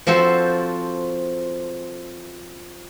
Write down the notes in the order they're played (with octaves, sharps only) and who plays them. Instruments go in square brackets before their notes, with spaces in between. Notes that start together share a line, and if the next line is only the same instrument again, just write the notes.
[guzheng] F3 C4 F#4 A4 C5